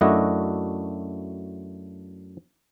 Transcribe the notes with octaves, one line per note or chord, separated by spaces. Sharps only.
F#2 A3 D4 E4 F#4 D#5